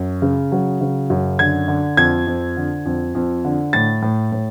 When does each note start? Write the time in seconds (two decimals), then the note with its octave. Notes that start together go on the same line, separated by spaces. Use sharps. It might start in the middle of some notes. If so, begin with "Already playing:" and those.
Already playing: F#2
0.22 C#3
0.52 F#3
0.81 C#3
1.10 F#2
1.39 D3 G#6
1.68 D3
1.97 F2 G#6
2.27 F2
2.57 D3
2.86 F2
3.15 F2
3.45 D3
3.73 A2 A6
4.02 A2
4.32 A2